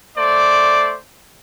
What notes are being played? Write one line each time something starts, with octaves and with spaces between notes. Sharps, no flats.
A3 C5 D5